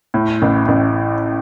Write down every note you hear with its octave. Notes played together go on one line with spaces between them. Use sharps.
A2
A1
A1